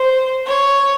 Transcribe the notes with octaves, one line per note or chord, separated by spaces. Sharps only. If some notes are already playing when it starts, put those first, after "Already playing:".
Already playing: C5
C#5